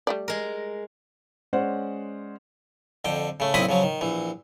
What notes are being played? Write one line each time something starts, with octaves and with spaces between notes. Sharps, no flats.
G3 A3 D5
G#3 A#4
G#3 C#4 C5 D5 F#5
F2 D3 G5
C#3 A3
B1 A#2 C4 E4 B5 D#6
C#3 F3 F#3
D#3
A#1 E3